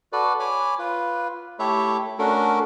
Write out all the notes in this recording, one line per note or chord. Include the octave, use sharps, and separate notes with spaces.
F#4 A4 B4 D5
C#5 G#5 B5 D6
F4 B4
A3 E4 G4 A4 C#5 E5
A3 C#4 D4 F#4 A4 A#4